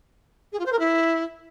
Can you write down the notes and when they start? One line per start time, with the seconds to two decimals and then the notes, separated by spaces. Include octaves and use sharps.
0.52 G#4
0.59 F4
0.65 C5
0.72 A#4
0.79 E4